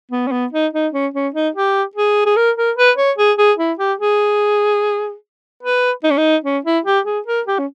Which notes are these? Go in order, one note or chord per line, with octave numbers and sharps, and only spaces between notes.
B3
C#4
B3
D#4
D#4
C#4
C#4
D#4
G4
G#4
G#4
A#4
A#4
B4
C#5
G#4
G#4
E4
G4
G#4
B4
D#4
C#4
D#4
C#4
E4
G4
G#4
A#4
G4
C#4